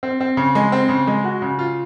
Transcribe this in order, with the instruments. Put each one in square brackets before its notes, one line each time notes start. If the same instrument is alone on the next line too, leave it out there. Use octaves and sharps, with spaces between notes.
[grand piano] C4
C4
C#3
G#3
C4
C#3
G#3
F#4
C#3
F4